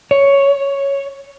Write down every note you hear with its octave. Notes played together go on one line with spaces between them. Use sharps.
C#5